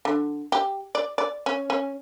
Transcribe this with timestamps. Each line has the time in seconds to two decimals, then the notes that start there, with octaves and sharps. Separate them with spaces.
0.05 D3
0.52 G4
0.95 D5
1.18 D5
1.46 C#4
1.70 C#4